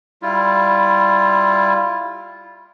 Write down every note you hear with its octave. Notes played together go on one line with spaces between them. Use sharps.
G3 E4 F4